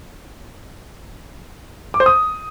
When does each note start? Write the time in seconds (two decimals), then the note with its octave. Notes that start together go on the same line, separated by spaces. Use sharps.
1.94 D6
2.00 C5
2.06 D#6